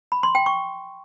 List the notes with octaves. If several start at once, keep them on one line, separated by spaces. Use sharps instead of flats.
B5
C6
G5
C#6